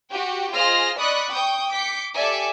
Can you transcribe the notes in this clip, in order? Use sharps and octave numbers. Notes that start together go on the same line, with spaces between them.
F#4 G4 G5
F4 G#4 C5 D#5 F6 A#6
D5 D#5 B5 C#6 D#6 F#6
G5 C#6 D#6 G6
D6 G6 B6 C#7
G4 A4 D5 E5 G#5